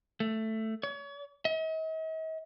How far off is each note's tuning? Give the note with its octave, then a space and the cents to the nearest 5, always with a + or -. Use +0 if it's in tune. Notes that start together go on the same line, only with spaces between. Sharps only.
A3 +5
C#5 +35
D#5 +45